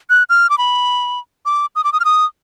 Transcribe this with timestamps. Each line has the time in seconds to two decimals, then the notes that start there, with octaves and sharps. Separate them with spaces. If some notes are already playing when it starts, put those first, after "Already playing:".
0.10 F#6
0.29 F6
0.50 D6
0.58 B5
1.46 D6
1.76 D#6
1.84 D6
1.93 D#6
2.00 F6
2.05 D#6